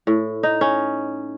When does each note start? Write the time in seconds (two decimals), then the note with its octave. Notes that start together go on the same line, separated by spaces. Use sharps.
0.07 A2
0.43 D#4
0.61 C#4